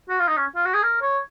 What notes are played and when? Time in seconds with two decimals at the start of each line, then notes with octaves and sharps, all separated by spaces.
0.09 F#4
0.19 F4
0.28 D#4
0.37 C#4
0.55 F4
0.65 F#4
0.74 G#4
0.83 A#4
1.02 C#5